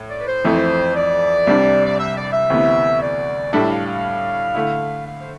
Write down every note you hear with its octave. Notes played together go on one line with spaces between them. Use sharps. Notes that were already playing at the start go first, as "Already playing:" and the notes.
Already playing: A2
D5
B4
C5
F2 E3 A3 C4 E4
D5
C2 C3 G3 D4
D5
E5
D5
E5
D2 C3 E3 B3
D5
A2 G3 D4 A4 E5
F5
F5
D3 A3 E4
F5
C5